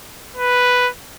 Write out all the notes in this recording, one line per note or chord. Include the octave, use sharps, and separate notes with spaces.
B4